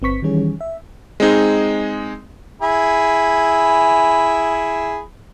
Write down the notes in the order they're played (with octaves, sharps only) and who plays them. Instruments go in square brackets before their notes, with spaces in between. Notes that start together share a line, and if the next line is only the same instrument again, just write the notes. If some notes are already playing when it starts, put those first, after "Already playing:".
[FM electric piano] G1 C4 B4 C#6 B6
D#3 E3 G3 C#4 G#4 C#5
E5
[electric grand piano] G#3 C4 D#4 G#4
[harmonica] E4 G#4 B5